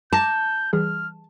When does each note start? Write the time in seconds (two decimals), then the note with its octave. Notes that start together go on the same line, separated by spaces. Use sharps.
0.13 A5 A#5 D6 G6 A#6
0.73 E3 G3 G#4 F6